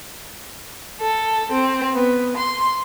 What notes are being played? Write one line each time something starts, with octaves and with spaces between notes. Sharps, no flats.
A4
C4
B3
C6